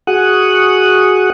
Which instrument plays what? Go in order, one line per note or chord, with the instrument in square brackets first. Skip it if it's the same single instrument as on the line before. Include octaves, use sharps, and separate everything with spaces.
[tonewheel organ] F#4 G#4 F#5 C#6 D#6 F#6